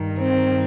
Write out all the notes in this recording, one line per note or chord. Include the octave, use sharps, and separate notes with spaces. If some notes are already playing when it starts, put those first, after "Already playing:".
Already playing: G2 D#3
C4